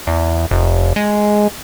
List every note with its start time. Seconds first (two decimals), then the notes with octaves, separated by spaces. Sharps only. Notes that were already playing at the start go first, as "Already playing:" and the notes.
0.07 E2
0.51 F1
0.96 G#3